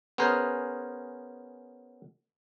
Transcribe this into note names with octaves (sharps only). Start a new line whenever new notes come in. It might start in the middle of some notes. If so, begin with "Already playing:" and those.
B3 C#4 G#4 A#4 C5